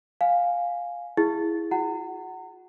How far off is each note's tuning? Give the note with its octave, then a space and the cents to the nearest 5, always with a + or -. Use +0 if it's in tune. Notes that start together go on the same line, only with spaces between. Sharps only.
F5 +10 G#5 +0
E4 +0 G#4 +0
F#4 -45 F#5 +20 A#5 -35